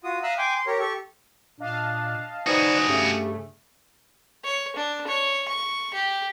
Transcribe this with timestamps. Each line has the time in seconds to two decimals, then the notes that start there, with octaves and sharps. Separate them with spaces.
0.04 F4 F#4 D#6
0.23 E5 F5 A#5 D#6 E6 F#6
0.38 G5 G#5 C6 D6
0.54 C6
0.67 G4 A#4 C#5
0.80 G4 A4 C#6
1.60 A#2 D4 D#5 F5 A5
2.46 D#4 F#4 G#4 B4 C5 D5 D#6
2.88 G2 C#3 A3 G4
4.44 C#5
4.76 D4
5.07 C#5
5.48 C#6
5.94 G4